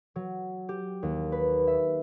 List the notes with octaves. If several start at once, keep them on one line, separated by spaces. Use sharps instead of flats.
F#3
G4
D#2
B4
E5